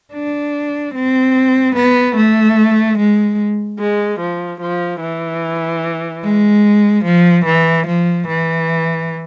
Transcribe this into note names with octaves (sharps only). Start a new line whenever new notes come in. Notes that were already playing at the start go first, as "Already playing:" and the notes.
D4
C4
B3
A3
G#3
G#3
F3
F3
E3
G#3
F3
E3
F3
E3